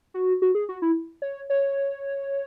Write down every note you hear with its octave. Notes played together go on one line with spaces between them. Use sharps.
F#4
F#4
G#4
F#4
E4
C#5
C#5